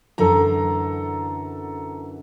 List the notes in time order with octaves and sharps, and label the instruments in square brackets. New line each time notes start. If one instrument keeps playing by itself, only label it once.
[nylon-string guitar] F#2 D3 E3 [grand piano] A4 A#5